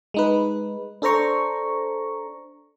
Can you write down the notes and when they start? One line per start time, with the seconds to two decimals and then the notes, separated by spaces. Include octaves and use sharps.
0.14 G#3 D#4 B4
1.02 D4 A4 C5 A#5 C#6